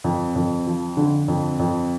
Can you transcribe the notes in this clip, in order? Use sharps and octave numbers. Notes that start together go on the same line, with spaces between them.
F2
F2
F3
D3
F2
F2